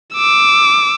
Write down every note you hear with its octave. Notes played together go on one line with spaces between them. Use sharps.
D6 E6